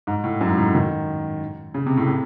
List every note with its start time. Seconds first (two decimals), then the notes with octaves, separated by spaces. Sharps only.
0.07 G#2
0.24 A2
0.41 F#2
0.49 G#2
0.58 A2
0.75 D#3
1.74 C#3
1.86 C3
1.97 A2
2.08 C3